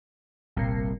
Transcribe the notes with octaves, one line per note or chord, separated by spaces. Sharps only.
G1 C2 A#2